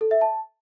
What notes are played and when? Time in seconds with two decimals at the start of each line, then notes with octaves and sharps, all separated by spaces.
0.01 A4
0.11 E5
0.21 A5